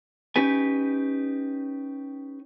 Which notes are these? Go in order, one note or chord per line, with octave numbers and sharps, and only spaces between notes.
C#4 D#4 G4 B4 G#5